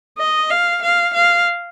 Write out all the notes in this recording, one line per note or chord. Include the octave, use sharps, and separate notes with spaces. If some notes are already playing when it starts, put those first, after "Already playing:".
D#5
F5
F5
F5